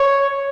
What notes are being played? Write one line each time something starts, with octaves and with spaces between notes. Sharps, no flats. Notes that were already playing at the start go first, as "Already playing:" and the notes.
Already playing: C#5